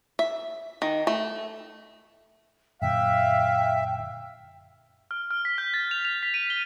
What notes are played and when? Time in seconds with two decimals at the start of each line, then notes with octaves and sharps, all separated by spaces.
0.19 E5
0.82 D#3
1.07 A3
2.82 F#2 A#2 D3 E5 F5 G5
5.11 F6
5.31 F6
5.45 B6
5.58 G6
5.74 A6
5.91 F7
6.05 F7
6.23 B6
6.34 D#7
6.50 G7